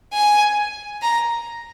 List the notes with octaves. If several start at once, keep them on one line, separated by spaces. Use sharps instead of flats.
G#5
A#5